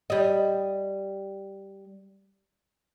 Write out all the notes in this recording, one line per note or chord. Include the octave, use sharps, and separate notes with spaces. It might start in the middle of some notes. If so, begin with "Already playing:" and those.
G3 D#5